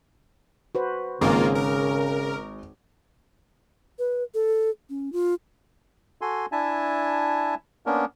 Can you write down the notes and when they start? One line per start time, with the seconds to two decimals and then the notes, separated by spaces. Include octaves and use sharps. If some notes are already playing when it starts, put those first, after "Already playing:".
0.75 F#4 B4 C5
1.21 G#1 C#3 A#3 F4 G#4 A#4
1.55 A#4
3.99 B4
4.34 A4
4.90 C#4
5.13 F4
6.21 F#4 A4 G#5 C6
6.52 D4 E4 E5 G#5 A5
7.86 A#3 B3 C#4 D4 A#4